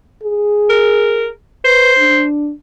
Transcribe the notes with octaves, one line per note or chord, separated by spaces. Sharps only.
G#4
A#4
B4 C5
D4